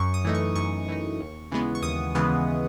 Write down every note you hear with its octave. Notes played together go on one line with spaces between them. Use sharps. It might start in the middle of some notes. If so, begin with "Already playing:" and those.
Already playing: F#2 C#6
D#6
E3 A3 D#4
C#6
F#2 C#6
E3 A3 D#4
D#2
C#3 E3 G#3 B3
C#6
D#2 D#6
C#3 E3 G#3 B3